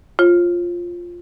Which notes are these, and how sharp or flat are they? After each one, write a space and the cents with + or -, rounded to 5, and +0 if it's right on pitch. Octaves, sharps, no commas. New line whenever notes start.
F4 +0 C#5 -45